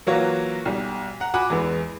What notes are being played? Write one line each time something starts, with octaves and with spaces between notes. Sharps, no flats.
E3 F#3 A#3 F4 F#4 C#5
B1 G3
F#5 A#5
F#4 F#5 G#5 B5 D6
E2 E3 G#3 B3